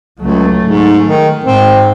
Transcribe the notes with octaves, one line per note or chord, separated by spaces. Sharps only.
C#2 F#3 A3
G#2
D#3
G#2 C4